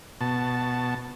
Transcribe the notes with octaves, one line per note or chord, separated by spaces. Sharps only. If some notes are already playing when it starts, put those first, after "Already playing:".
B2 A5